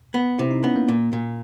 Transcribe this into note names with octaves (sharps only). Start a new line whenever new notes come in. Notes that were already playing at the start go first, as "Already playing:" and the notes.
B3
C3 E4
D#4
B3 C#4
A#3
A#2 A#3
A#2